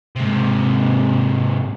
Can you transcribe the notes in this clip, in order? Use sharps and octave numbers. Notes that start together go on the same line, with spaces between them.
G#2 C3